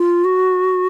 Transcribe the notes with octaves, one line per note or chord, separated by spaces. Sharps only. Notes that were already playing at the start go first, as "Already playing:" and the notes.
Already playing: F4
F#4